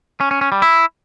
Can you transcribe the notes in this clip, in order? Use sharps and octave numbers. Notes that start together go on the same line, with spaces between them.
C#4
C#4
C#4
G3
E4